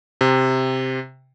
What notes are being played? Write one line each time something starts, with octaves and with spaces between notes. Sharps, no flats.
C3